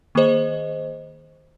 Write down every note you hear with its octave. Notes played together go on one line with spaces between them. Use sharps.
D#3 A#3 G#4 C5 D#5